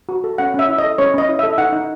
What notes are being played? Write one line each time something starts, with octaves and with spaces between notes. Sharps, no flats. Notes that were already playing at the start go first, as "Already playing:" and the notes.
F#4
A4
C#4 F#5
C#4 E5
E4
D#5
A4
C#4 C#5
C#4 D#5
E4
A4 E5
D#4 F#5
D#4